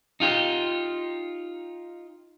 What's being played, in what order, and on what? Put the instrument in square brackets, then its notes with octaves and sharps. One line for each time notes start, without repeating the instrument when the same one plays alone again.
[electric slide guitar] D#4 F4 G4